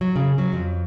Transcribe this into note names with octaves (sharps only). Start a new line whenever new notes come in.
F#3
C#3
F#3
F2